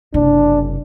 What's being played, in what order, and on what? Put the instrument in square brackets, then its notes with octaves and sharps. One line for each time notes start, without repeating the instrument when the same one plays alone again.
[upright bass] F#1 C3 [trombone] D4